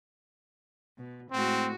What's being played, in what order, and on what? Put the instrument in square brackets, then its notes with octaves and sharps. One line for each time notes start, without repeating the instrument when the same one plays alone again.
[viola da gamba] B2
[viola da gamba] A2 G#3 F#4 [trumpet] C4